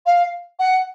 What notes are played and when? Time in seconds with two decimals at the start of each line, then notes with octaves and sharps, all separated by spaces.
0.05 F5
0.59 F#5